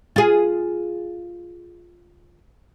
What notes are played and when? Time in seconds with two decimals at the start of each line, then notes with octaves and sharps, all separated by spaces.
0.16 F4 G#4